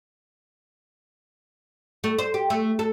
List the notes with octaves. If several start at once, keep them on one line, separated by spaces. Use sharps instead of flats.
A3
C5
G4
A3
A4